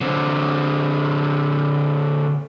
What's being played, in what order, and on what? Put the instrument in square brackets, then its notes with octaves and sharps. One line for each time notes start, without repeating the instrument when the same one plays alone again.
[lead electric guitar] D3 C4